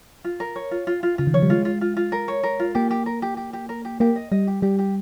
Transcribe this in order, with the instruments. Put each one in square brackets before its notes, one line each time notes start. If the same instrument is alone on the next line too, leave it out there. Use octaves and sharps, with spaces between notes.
[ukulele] F4
A#4
C#5
F4
F4
F4
[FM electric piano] C#3 [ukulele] F4
[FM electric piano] D#3
[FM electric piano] F3 [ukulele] C#5
[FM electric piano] G3
[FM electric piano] G#3 [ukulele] F4
[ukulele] F4
F4
F4
A#4
C#5
A#4
F4
[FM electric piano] A#3 [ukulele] G4
[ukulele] G4
A#4
G4
G4
G4
A#4
G4
[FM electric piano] A#3 [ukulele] G4
[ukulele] D#5
[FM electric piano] G3 [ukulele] D#5
[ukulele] G4
[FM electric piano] G3 [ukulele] G4
[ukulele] G4